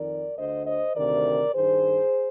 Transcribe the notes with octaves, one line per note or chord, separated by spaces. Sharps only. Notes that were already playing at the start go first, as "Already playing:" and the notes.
Already playing: F2 D#3 A#4 D5
D2 D3 C5 D#5
C5 D#5
D2 C3 D#3 A#4 D5
G2 D#3 G#4 C5